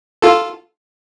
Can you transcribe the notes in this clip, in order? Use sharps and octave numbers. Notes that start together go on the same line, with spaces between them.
F4 A4